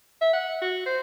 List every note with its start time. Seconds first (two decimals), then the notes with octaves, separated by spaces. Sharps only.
0.21 E5
0.33 F#5
0.61 F#4
0.86 C5